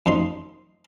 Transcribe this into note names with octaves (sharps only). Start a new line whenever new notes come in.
F#2 F3 D#4 C6